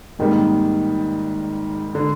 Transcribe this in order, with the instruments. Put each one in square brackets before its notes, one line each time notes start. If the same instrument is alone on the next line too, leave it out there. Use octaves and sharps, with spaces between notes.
[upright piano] G#1 G#2 G3 A#3 [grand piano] D#3
[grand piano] D3